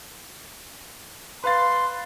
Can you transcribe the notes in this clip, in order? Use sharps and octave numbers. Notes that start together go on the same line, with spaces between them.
B4 F5 C6 A6